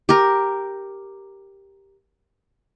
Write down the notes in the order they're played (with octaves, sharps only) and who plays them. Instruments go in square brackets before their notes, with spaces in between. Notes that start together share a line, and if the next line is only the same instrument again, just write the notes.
[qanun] G4 A#4